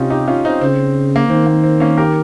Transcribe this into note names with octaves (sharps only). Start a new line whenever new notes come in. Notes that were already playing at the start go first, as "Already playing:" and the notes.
Already playing: C3 C#4 D#4 F4 G4
D#4 G4
C#4 F4
C4 D#4
C#3 C4
A#3
D#3 C4
A#3
C4
A#3 C#4
G4 A#4